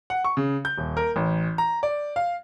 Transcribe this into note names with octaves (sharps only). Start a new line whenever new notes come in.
F#5
C#6
C#3
G6
D#1
A#4
A1
A#5
D5
F5